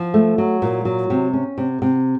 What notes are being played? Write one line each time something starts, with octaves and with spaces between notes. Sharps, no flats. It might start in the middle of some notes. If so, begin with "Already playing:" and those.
Already playing: F3
A3
F#3
A#2
F#3
C3
C#4
C3
C3